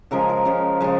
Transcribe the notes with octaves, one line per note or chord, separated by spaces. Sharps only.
C#3 F3 G#3 A#4
A#4
C#3 F3 G#3
C#3 F3 G#3